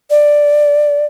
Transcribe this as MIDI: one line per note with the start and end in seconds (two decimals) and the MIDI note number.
0.10 1.06 74